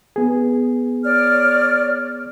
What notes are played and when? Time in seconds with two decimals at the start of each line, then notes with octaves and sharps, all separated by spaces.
0.16 B3 G#4
1.04 C#5 D5 F6